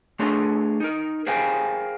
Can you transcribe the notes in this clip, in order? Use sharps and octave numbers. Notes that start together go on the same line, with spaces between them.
A3 D4 G#4 C#5 C6
D#4 A#4
G#4 A#4 C5 F5 G5 G#5